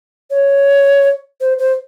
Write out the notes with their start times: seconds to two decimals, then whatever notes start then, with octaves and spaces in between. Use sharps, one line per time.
0.30 C#5
1.41 C5
1.59 C5